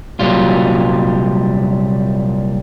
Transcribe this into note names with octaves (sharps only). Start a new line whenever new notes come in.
C2 A#2 F#3 G3 F4